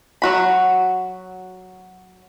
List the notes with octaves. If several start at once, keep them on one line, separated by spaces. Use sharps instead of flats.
F#3 F#4 B5